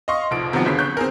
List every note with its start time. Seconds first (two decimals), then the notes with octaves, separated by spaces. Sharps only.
0.08 D#5 F5 C6 C#6
0.31 F1 C2 F3 D7
0.53 C3 D#3 F3 F#3 B3
0.65 G1 C#3 B6 C7
0.79 C#6 F#6 G6
0.97 C4 G#4 A#4